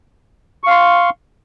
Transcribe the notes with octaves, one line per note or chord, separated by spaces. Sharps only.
F5 C6 C#6